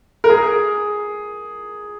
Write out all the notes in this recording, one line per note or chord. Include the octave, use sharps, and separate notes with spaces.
A#4
G#4